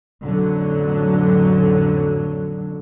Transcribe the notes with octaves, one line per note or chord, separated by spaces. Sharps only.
A1 F2 D3 F#3